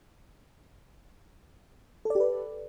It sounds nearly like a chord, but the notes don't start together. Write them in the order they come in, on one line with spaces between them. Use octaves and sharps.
A4 D5 G4 B4